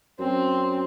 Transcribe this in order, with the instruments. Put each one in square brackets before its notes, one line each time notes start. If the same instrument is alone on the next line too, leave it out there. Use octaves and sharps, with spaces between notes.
[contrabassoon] F#2 [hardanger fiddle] C4